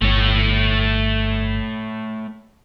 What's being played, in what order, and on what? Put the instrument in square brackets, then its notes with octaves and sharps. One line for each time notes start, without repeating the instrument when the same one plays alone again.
[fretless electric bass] G1 [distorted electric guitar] A3 C#5